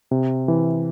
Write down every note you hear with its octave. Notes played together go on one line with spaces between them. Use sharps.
C3
E3